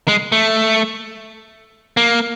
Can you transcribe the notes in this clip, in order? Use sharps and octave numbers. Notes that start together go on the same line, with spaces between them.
G#3
A3
A#3